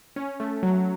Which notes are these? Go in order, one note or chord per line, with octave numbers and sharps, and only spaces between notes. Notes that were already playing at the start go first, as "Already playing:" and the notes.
C#4
A3
F#3